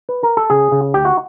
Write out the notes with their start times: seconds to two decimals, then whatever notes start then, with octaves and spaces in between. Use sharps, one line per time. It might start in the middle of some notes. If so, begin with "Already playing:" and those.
0.09 B4
0.23 A#4
0.37 A4
0.50 C#3 G#4
0.72 C#3
0.94 D2 G4
1.05 F#4